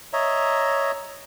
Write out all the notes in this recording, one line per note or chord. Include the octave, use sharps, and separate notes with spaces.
C#5 D#5 E5 A#5